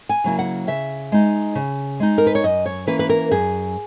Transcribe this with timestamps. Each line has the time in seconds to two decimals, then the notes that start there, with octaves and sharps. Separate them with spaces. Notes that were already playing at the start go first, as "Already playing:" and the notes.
0.09 G#5
0.24 C#3 F#3 A#3 E4
0.39 F#5
0.67 C#3 E5
1.12 G#3 D#4
1.55 C#3
2.00 G#3 D#4
2.18 A#4
2.27 B4
2.35 C#5
2.44 F#2 D#5
2.66 C#5
2.87 E3 A#3 C#4 B4
2.99 B4
3.09 A#4
3.31 F#2 G#4